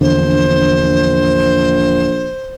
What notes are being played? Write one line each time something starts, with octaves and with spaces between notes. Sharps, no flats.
A#1 E2 D3 C5